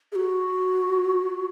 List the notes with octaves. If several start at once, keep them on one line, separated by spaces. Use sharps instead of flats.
G#4
F#4